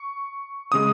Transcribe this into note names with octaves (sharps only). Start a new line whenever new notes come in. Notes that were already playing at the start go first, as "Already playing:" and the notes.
Already playing: C#6
C#3 G#3 D#6